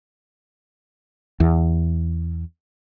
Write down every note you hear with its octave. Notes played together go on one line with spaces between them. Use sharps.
E2